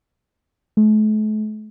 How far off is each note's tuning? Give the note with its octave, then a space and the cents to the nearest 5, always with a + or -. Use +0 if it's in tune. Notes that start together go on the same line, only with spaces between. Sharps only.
A3 -45